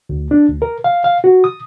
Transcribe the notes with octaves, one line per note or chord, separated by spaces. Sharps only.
D2
D4
D2
A#4
F5
F5
F#4
D#6